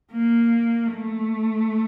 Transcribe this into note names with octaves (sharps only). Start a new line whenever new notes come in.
A#3
A3